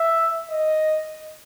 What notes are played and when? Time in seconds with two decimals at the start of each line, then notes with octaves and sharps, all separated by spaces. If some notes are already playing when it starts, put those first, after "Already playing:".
Already playing: E5
0.50 D#5